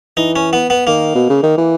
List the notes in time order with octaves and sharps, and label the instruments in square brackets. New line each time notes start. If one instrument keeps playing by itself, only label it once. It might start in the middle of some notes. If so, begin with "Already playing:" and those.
[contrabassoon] E3 [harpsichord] D#4
[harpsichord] C#4
B3
B3
[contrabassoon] D#3 [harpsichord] A#3
[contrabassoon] B2
C#3
D#3
E3